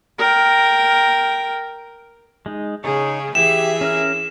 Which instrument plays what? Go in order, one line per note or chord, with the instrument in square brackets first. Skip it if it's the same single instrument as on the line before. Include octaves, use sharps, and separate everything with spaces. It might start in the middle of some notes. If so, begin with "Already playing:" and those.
[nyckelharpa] A#4 G5
[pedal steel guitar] G#3 D#4
[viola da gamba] C#3 [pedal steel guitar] D#4 C#5 [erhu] G#4
[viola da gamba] E3 G#4 [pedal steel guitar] G4 [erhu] E5 [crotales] E7
[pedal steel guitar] C#4 A#4 F6